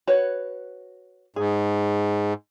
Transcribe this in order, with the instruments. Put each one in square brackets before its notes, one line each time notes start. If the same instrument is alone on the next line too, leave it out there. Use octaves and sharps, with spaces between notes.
[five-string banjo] F#4 B4 C#5
[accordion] G#2 [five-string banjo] G#4